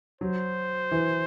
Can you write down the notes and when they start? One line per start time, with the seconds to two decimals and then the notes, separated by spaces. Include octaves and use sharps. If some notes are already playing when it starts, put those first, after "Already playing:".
0.21 F#3 C5
0.92 E3